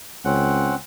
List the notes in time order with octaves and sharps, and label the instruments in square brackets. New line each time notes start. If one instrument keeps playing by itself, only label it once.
[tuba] C#2 [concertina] C4 C#4 F#5